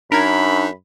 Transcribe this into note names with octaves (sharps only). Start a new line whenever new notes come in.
F#2 D4 D#4 A#4 B5 G#6